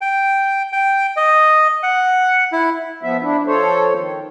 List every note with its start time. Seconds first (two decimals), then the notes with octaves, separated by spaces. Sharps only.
0.01 G5
0.72 G5
1.16 D#5
1.83 F#5
2.52 E4
3.03 F3 B3 E5
3.21 D4 E4
3.47 F3 A4 C5 C#5
3.95 D#3